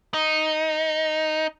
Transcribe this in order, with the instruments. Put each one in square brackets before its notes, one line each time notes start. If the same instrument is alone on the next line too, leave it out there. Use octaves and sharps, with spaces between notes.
[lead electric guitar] D#4